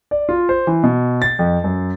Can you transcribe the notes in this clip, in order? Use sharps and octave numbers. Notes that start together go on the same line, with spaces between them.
D5
F4
C5
E3
B2
A6
F2
F#2